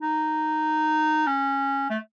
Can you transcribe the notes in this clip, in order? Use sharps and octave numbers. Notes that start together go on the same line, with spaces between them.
D#4
C#4
A3